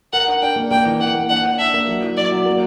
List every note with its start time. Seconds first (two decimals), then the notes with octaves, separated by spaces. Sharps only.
0.13 A#4 F#5
0.28 D4
0.42 D4 G5
0.56 A#3
0.71 A#3 G5
0.86 E3
1.00 A#3 F#5
1.15 A#3
1.29 D4 F#5
1.44 D4
1.59 D4 E5
1.74 A#3
1.87 F#3
2.02 E4
2.17 F#3 D5
2.32 F#3
2.46 A#3